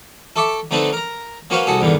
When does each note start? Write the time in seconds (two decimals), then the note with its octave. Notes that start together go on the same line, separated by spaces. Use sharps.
0.36 A4 E5 C#6 D6
0.71 D3 A3 C4 D#4 A4 B4
0.93 A#4 A#5
1.50 A#3 C#4 F#4 B4 C5 F5
1.67 C2 F#4 G#4 A4
1.81 E2 G2 D3 D#3